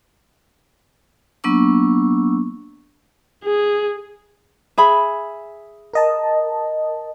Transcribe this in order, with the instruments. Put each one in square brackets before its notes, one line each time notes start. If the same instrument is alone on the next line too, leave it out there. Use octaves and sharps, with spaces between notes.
[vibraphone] F#3 A#3 B3 D4 C#6 E6
[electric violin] G#4
[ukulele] G#4 E5 B5
[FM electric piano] A#4 D#5 A5